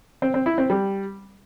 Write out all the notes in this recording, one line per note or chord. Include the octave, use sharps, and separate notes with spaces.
C4
C4
E4
C4
G3